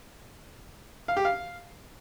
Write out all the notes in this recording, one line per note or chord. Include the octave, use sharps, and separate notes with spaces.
F5
G4
F5